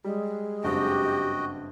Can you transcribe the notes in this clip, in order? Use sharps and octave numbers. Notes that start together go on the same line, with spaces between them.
G3 G#3
F#1 G2 C4 F#4 G4 D#5 G5